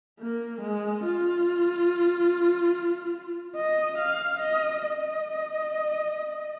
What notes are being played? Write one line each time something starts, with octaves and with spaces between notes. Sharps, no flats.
A#3
G#3
F4
D#5
F5
D#5
D#5